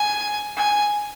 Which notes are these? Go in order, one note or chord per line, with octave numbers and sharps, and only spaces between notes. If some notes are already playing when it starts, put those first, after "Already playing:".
Already playing: G#5
G#5